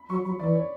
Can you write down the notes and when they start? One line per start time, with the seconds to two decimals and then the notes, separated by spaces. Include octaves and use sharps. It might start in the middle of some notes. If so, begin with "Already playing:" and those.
Already playing: B5
0.09 F#3 C#6
0.25 F#3 B5
0.39 E3 D5
0.55 C#5